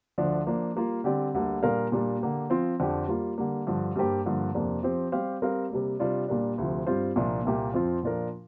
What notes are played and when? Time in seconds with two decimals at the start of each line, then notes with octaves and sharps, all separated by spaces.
0.18 D2 D3 F3 D4
0.47 F3 A#3 D4
0.76 G3 A#3 F4
1.04 D3 G3 C4 G4 D5
1.34 D2 D3 G3 A#3
1.63 A#2 G3 D4 A#4 F5
1.92 A#2 G3 A#3 D4
2.21 D3 A#3 G4
2.50 F3 C4 F4 C5
2.80 F2 D3 F3 D4 G4
3.08 G3 A#3 F4
3.38 D3 G3 A#3
3.67 G2 D3 F3
3.96 G2 G3 A#3 G4 C5
4.26 G2 D3 F3 A#3
4.55 F2 C3 F3 A#3 D4
4.83 F3 C4 G4 C5
5.12 G3 C4 G4 C5 F5
5.42 G3 C4 A#4 F5
5.70 C3 G3 A#3
6.00 C3 G3 D4 F4 D5
6.28 A#2 G3 A#3 D4
6.58 D2 C3 F3
6.87 G2 G3 C4 F4 C5
7.16 C2 A#2 F3 A#3 D4
7.45 C2 A#2 A#3 G4
7.74 F2 F3 C4 F4
8.03 A#2 F3 D4 F4 A#4